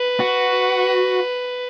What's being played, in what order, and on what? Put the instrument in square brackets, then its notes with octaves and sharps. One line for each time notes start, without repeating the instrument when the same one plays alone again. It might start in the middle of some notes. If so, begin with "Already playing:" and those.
Already playing: [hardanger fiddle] B4
[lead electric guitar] F#4